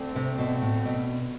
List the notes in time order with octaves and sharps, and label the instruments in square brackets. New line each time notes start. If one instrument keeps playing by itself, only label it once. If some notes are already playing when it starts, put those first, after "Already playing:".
Already playing: [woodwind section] D2 D3 A3 C4
[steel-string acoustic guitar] C3
B2
A2
B2